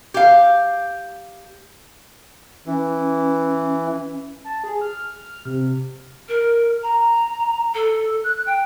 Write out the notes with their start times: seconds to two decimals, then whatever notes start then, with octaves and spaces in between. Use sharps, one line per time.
0.14 G4 F5
2.66 E3 C#4
4.44 A5
4.64 G#4
4.81 F6
5.45 C3
6.28 A#4
6.83 A#5
7.74 A4
8.24 F#6
8.46 G5